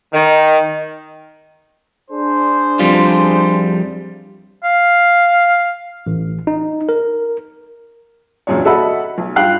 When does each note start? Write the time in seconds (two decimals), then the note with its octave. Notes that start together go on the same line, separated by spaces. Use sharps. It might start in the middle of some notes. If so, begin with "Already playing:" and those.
0.13 D#3
2.11 D4 G#4 C5
2.79 F2 G3 F4
4.64 F5
6.07 A1
6.47 D#4
6.89 A#4
8.47 E1 F#2 A#2 D4 C#5
8.65 F#4 A4 D#5 E5 F#5 B5
9.18 B1
9.36 G2 F4 F5 G5 F#6 C7